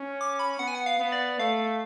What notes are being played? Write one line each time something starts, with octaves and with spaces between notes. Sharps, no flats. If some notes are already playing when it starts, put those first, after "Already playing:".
Already playing: C#4
D6
B5
B3 F#5
G#5
F#5
F5
B3
D5
A3 F5